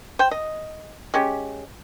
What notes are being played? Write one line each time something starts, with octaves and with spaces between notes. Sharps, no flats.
C5 G5
D#5
G#3 C#4 G4